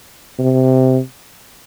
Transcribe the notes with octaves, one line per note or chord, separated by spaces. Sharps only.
C3